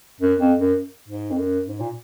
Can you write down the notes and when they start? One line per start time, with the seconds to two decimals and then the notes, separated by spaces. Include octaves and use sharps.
0.21 F#2
0.39 F2
0.59 F#2
1.08 G#2
1.31 F2
1.38 F#2
1.68 G#2
1.80 A#2